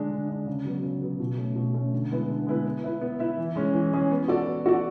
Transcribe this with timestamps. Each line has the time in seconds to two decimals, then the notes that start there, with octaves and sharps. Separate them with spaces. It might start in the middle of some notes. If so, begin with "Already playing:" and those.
Already playing: D3 G#3 D4
0.10 D3
0.29 G#3 D4
0.46 C#3
0.65 F#3 B3
0.83 C#3
1.02 F#3 B3
1.20 B2
1.37 A3 C#4
1.56 B2
1.74 A3 C#4
1.92 D3
2.11 G#3 B3 E4 B4
2.29 D3
2.47 G#3 B3 E4 B4
2.66 B3
2.84 E4 B4 E5
3.01 B3
3.19 E4 B4 E5
3.37 E3
3.56 G#3 C#4 G#4
3.74 E3
3.93 G#3 C#4 G#4
4.11 B3
4.28 F#4 A4 D5
4.46 B3
4.66 F#4 A4 D5